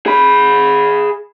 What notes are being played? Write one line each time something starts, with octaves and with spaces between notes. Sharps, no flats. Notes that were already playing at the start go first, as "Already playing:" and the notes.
G#4 B5